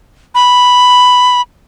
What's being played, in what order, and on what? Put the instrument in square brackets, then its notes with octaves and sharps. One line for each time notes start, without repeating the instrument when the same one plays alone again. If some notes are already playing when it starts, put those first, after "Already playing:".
[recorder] B5